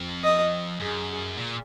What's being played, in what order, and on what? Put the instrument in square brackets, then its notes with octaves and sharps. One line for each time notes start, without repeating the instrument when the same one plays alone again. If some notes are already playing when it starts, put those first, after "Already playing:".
Already playing: [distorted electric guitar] F2
[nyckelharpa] D#5
[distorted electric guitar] F#2 [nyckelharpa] G#4
[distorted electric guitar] A#2